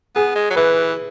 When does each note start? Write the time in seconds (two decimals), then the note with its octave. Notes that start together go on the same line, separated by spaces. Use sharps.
0.15 B3 G#4
0.35 G#3
0.50 F#3
0.56 E3 B4